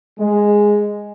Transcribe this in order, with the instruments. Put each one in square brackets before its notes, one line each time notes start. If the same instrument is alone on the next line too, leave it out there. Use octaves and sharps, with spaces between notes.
[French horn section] G#3